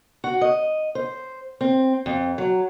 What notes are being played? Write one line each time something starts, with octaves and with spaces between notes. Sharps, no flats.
F#4
D#5
C5
C4
F2
F#3